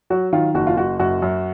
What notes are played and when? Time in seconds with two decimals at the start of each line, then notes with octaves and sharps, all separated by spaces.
0.10 F#3 F#4
0.33 D#3 F4
0.55 F#1 F#4
0.67 F4
0.77 F#1 F#4
0.99 F#2 F#4
1.22 F#2